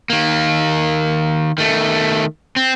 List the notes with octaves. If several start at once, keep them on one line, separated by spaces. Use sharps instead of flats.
D#3 A#3
D#3 A3
C4